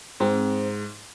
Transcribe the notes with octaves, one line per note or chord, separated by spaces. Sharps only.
G#2 C4